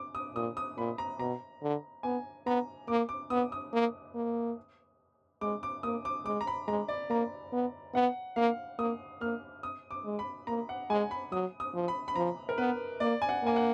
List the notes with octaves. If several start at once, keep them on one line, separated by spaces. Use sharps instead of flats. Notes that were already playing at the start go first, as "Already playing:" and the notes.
Already playing: D6
D#6
A#2 D#6
D#6
A#2 B5
A#5
B2 A#5
D3
B3 G#5
B3 A#5
A#3 D6
D6
B3 D#6
D#6
A#3
A#3
G#3 D6
D6
A#3 D#6
D6
G#3 D6
A#5
B5
G#3 A#5
D5
A#3 A#5
B3
B3 F#5
A#3 F5
A#3 D#6
A#3 F6
D#6
D6
G#3
B5
A#3 A#5
F#5
G#3 G#5
B5
F#3 D#6
D#6
F3
B5
B5
F3 A#5
A#4
B3 B4
A#3 D5
G#5
F#5
A#3 G#5
F#5